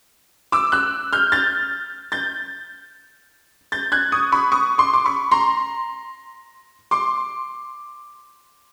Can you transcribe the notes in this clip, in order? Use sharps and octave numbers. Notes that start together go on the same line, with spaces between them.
D6 E6
E6 F#6
F6 G6
G6 A6
G6 A6
G6 A6
F#6 G#6
C#6 D#6
B5 C#6
C#6 D#6
C6 D6
D6
B5 C#6
A#5 C6
C6 D6